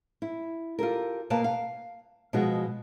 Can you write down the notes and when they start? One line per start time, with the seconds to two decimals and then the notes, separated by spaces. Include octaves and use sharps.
0.22 E4
0.79 F4 G4 A4 A#4
1.30 B2 A#3 B4 F5 A5
1.44 F5
2.33 B2 F3 G#3 F#4 G#4